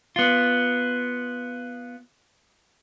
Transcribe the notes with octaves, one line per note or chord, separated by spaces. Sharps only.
B3 F4